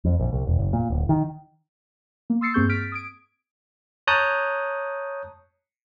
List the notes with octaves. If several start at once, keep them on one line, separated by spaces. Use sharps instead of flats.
F2
A#1
C2
E1
F#1
A#2
D1
D#3
A#3
C6 D#6 E6 A6 C7 C#7
G2 A#3 C4 G#4 C#6 G6
F6 A6 B6 D7
D#6 G#6 D7
C#5 A5 A#5 D#6 F#6 G6